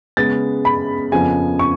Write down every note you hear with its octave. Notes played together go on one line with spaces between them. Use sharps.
C#3 G#3 B3 A6
B5
F2 C#3 F3 B3 G#5
C#6